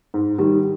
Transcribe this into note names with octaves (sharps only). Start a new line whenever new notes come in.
G#2
D#3 G3